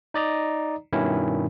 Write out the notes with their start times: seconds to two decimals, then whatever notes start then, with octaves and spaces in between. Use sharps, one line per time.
0.14 D#4 D5 D#5 A#5
0.93 G2 B2 D#3 C#4 E4